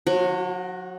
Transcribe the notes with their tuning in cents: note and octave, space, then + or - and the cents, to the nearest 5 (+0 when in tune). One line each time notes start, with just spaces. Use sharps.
F#3 -40 F#4 +15